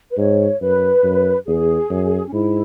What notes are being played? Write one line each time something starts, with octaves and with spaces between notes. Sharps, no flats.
B4
G#2 C#5
F#2 B4
F#2
E2 G#4
F#2
C#4
G#2 E4